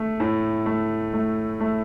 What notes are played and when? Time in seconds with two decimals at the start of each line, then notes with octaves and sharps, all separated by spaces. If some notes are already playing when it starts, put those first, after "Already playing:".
Already playing: A3
0.20 A2
0.66 A3
1.13 A3
1.60 A3